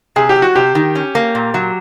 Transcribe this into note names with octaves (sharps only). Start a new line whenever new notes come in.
C3 G#4
G4
F#3
F#4
C3 G4
D#3
C#4
A#3
A#2
F#3